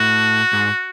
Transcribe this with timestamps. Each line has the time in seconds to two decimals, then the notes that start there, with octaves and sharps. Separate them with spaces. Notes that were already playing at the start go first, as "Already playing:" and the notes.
Already playing: A2 F#4
0.53 G#2